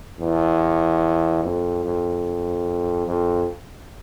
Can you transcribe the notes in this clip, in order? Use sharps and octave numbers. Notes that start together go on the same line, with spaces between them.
E2
F2
F2
F2